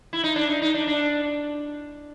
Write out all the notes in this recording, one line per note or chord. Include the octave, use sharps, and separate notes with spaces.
E4
D#4
D4
D#4
D#4
D4
D4